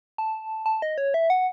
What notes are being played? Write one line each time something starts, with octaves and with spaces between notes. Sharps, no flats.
A5
A5
D#5
C#5
E5
F#5